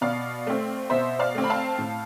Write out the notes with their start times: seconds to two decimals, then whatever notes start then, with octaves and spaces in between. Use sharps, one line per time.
0.01 B2 D5 F5
0.47 A3 C4
0.90 B2 C5 E5
1.19 D5 F5
1.35 A3 C4
1.44 B5
1.50 F5 A5
1.78 A2